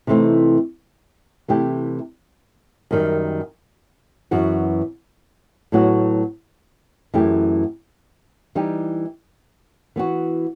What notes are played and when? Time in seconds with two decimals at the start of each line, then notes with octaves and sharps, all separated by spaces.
0.07 C3 E3 A3 C4 D#4
1.48 C3 E3 A3 E4 G4
2.91 F#2 D#3 G3
4.31 F#2 E3 B3 F#4
5.72 A2 F#3 B3 F#4
7.14 F#2 E3 A3 E4 G4
8.55 E3 G3 D#4 G4
9.96 E3 B3 F#4